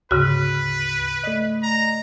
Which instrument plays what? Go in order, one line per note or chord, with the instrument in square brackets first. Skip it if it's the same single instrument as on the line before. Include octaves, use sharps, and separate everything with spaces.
[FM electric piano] D2 [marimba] G#2 C#3 F#4 [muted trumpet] B4
[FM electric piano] A3 D5 D#5
[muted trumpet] A#5